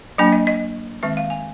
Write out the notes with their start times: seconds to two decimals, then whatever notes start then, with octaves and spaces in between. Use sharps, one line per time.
0.18 F#3 A#3 D4 G#5
0.32 D#5
0.47 D#5
1.03 D#3 G#3 C4 E5
1.17 F5
1.30 G#5